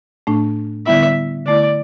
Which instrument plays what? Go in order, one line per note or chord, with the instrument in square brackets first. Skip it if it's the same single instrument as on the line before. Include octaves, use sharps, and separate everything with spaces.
[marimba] A2 A3 D4
[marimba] D3 G3 B3 E4 [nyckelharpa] E5
[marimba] D3 A3 E4 [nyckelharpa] D5